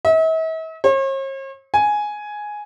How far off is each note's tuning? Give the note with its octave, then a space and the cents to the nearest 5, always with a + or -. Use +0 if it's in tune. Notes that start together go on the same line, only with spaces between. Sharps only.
E5 -45
C#5 -45
G#5 +5